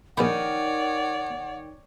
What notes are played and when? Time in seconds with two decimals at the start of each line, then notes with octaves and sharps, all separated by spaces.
0.17 A#1 D#3 C#5 D5 F#5 A#5 B5